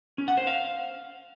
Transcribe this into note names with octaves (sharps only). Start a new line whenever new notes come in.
C#4
F#5
C5
F5